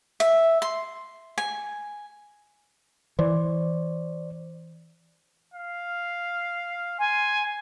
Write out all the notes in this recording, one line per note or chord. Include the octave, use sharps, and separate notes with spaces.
E5
C6
G#5
E3 C5 D5
F5
G#5 C6